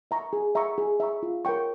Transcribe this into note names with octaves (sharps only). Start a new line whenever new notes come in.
E5 A#5 C#6
G#4
E5 A#5 C#6
G#4
E5 A#5 C#6
F4
A#4 C#5 G5 C#6